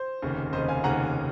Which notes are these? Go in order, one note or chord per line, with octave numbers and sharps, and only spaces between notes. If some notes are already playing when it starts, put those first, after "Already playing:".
Already playing: C5
F1 D#2 C#3
F1 D#2 C#3 C5 D#5
F5 G#5
F1 D#2 C#3 F#5 A#5